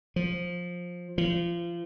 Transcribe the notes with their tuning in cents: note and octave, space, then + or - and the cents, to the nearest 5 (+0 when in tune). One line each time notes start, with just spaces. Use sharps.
F3 +15
F3 -30